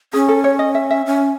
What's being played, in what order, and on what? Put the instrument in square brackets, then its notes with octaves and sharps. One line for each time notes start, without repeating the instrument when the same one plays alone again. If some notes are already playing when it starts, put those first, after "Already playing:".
[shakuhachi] C#4 [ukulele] G#4
[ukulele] A4
C#5
D#5
E5
E5
[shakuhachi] C#4